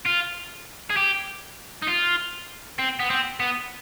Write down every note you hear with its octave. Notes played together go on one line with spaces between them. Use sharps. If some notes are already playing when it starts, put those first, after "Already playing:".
F4
G#4
G4
D#4
F4
C4
B3
C4
B3